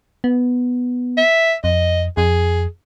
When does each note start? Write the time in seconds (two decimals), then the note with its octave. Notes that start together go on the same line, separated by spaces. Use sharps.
0.24 B3
1.17 E5
1.64 F2 D#5
2.17 F2 G#4